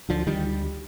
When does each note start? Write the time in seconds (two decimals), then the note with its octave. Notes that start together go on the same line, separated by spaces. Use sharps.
0.09 D2 D3 F3
0.27 D2 D#3 G3